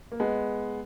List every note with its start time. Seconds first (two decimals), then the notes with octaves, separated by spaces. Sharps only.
0.12 A#3
0.20 G#3 B3